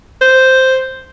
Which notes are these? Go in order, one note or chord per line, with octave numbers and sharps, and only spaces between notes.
C5